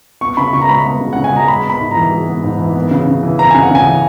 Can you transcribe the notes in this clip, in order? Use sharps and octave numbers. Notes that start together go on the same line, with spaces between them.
B3 C#6
C#3 B5
C#3 C#6
A#5
G#3 B5
B3 B5
C#3
C#3 F#5
G#5
G#3 A#5
G#3 B5
B3
B5
G#2
E3 A#5
G#3
B3
G#2
E3
B3
C#3
C#3
E3
B3 A#5
C#3 G#5
F#5
C#3 G#5
E3